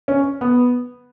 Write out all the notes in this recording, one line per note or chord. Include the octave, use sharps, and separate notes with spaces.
C#4
B3